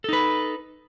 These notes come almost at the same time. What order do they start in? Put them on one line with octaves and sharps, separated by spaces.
A4 D#4 B4